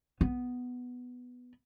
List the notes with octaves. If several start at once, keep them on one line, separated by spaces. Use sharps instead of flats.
B3